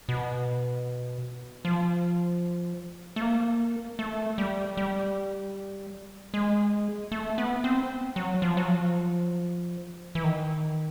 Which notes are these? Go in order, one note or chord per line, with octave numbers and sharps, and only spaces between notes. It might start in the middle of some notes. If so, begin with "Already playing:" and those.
B2
F3
A3
A#3
A3
G3
G3
G#3
A3
B3
C4
F#3
F3
F#3
F3
E3
D#3